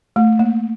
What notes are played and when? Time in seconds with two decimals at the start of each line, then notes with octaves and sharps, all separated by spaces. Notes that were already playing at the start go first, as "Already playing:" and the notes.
0.16 A3
0.39 A#3